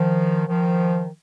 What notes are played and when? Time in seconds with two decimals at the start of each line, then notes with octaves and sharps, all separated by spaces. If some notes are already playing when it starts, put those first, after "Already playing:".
Already playing: D#3 F3
0.48 D#3 F3